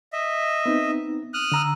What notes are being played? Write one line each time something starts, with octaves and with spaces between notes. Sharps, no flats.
D#5 E5
B3 C4 D#4
D#6 F6 F#6
D3 A#5 E6